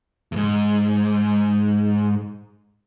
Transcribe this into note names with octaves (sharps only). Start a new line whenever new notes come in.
E2 G#2